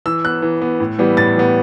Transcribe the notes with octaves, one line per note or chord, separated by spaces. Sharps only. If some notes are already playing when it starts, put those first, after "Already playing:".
E3 E6
B3 F#6
E3
B3
A2
E3 G3 B3
A2 A6
E3 G3 B3